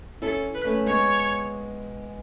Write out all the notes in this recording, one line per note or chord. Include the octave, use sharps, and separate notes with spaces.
C#4 E4 A4
B4
A3 C#4
G#3 B3 C#5